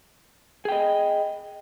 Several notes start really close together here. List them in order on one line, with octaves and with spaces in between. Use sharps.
G#4 G5 D#5